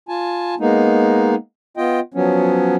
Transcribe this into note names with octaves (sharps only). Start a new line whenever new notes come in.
F4 G#5 A5
G#3 A#3 B3 D#4
B3 F4 D#5 G5
F3 F#3 B3 C#4